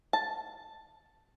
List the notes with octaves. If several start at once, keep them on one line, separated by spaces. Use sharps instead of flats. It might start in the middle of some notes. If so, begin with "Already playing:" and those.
A5